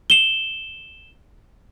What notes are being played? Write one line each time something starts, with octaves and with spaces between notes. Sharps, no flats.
E7 G7